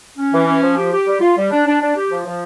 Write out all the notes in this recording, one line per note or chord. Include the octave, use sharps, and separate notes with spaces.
C#4
E3
C#4
F3
G4
G4
G3
F4
G3
D4
D4
D4
G4
F3
F3